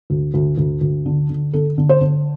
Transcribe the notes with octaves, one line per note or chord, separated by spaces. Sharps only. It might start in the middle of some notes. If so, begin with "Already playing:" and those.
D2
D2
D2
D2
D3
D3
D3 A4
D3
C5
D3